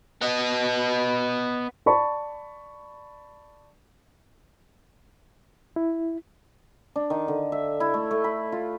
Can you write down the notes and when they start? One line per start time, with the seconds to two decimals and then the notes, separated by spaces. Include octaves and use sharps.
0.21 B3 D#5
1.86 D5 A5 B5 C#6
5.76 E4
6.96 D4
7.10 D#3
7.28 D3
7.52 E5
7.80 E4
7.94 A3
8.11 A3
8.24 B5
8.52 F4